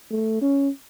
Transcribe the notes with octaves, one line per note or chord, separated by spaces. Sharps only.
A3
C#4